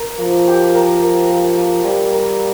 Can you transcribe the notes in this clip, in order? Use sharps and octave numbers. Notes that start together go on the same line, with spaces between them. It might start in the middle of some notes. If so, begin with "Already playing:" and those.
Already playing: A#4
F3 A#3
G4
A#4
A#3
A#3
A#3
G3 G4
A#4